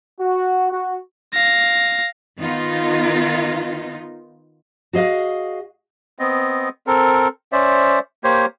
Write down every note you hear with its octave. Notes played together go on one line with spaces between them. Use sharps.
F#4
F#4
F5 A#6
D#3 B3 D#4 F4
F#4 G#4 D#5 F5
B3 C4 D#5
C4 A4 A#4
C#4 C5 D5 E5
A#3 G4 C5 C#5